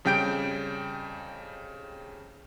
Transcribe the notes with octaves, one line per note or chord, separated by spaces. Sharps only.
F2 C#3 G3 G5 G6 D7